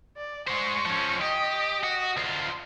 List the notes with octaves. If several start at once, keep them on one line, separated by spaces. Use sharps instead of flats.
D5
G#3 C5 C#6
F3 C#4
G4 D#5
F#4
D2 F4